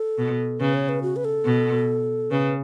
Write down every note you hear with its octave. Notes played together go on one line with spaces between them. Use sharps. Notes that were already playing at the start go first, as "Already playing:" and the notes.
Already playing: A4
B2
C#3 B4
C#5
B4
F#4
B4
A4
B2
C#3 B4